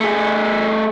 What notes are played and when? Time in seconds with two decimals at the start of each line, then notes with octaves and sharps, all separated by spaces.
0.01 A3 G#4